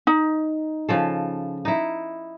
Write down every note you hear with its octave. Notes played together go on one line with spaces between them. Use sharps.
D#4
C#3 F3 A4
D#4 E4